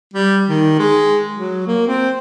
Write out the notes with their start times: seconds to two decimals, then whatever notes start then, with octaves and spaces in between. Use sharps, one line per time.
0.14 G3
0.49 D#3
0.79 G#3
1.33 F#3
1.67 A#3
1.87 C4